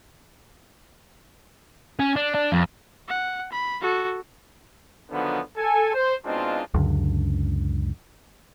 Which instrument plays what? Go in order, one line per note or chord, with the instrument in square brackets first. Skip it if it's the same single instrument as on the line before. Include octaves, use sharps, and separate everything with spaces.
[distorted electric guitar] C#4
D4
D4
F2
[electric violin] F#5
B5
F#4 A4
[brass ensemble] D3 D#3 F3 F#3 B3
A4 G#5
C5
B2 G#3 C4 D4 D#4 F4
[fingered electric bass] C#2 F#2 D3